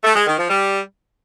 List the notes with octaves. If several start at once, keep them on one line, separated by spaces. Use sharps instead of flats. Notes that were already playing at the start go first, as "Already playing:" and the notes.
A3
G#3
D#3
F3
G3